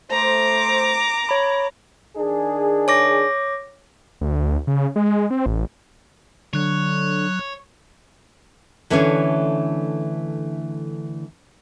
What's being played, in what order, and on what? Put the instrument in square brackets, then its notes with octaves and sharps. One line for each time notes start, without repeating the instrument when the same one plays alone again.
[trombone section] A3 C5 [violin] A#5 D6
[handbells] C#5 B5
[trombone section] D#3 D4 G#4
[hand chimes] C#5 D6 A#6
[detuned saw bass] D2
C#3
G#3
C4
A1
[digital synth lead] D3 [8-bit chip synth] F#3 F#6 [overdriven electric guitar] C#5
[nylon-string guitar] D3 E3 A3 C#4 D4 C#5